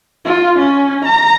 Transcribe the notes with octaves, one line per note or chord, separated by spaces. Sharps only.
F4
C#4
A#5